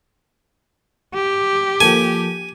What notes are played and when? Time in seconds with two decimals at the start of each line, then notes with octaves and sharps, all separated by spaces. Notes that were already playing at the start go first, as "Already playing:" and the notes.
1.15 G4
1.81 F3 A#3 A4 G#5